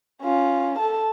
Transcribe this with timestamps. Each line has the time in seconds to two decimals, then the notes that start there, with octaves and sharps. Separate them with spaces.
0.22 C#4 F4
0.79 A4 A5